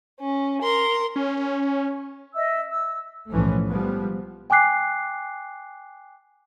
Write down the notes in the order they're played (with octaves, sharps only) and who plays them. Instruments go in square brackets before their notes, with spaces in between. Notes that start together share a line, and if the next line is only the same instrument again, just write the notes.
[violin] C#4
A#4 C6
[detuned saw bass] C#4
[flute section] D#5 E5 E6
E6
[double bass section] B1 A2 E3 F3 A3 C#4
F3 G3 G#3 B3
[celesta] G5 G#5 D6 F#6 C7